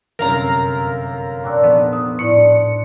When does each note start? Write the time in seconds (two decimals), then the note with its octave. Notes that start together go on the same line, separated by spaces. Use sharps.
0.19 G1 F#2 C3 A#4 F5 A#5
1.44 A#2 C4 D4 F#4 E6
1.63 F1 B3
1.93 D#6
2.19 A2 D3 E4 C#7